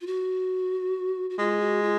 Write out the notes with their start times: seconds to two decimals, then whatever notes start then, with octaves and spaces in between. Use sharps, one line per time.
0.01 F4
0.07 F#4
1.30 F#4
1.39 G#3 F4
1.61 F#4
1.83 F4